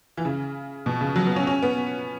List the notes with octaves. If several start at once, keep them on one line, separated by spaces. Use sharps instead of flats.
E3
C#3
B2
C#3
F#3
B3
C#4
C#4
B3